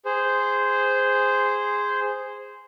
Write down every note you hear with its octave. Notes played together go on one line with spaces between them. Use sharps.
G#4 C5